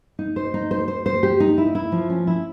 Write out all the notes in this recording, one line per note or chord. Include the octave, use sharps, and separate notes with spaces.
D#4
C5
D#4
C5
C5
C5
G4
D#4
E4
E4
F3
C#4
E4